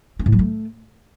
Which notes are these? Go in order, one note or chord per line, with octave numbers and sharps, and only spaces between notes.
C#4
A2
F#3
A3